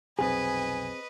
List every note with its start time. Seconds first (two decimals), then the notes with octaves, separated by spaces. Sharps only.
0.19 F1 B1 C4 G#4 B4 D#5 G#5